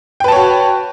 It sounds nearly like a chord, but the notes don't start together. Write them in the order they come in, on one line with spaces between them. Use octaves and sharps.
G5 B4 A5 C#5 F#4